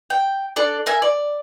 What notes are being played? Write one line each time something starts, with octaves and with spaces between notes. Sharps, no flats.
G5
D4 A4 D5
A#4 E5 G#5
D5